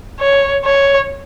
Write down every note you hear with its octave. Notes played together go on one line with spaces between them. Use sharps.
C#5
C#5